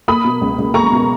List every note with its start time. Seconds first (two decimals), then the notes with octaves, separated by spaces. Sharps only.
0.08 A#3 B5 D#6
0.25 B2
0.41 C#2
0.58 C#2
0.74 A#3 A#5 C#6
0.92 B2